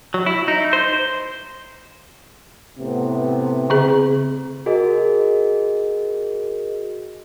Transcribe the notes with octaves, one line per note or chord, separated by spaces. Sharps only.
F#3
E4
D#4
C5
A2 C3 B3
C#3 C4 G#4
F#4 G#4 A#4 D#5